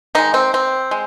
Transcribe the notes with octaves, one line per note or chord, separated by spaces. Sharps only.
D#3 G#3 D#4
C4
C4
G#3